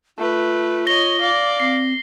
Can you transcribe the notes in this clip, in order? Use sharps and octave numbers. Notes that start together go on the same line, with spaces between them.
A3 F4 B4
C#5 D#5 A#6 G7
D5 F5
C4 C7